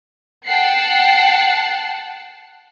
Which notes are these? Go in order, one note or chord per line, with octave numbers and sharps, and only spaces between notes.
F#5 G5 A5 F#6 C7 C#7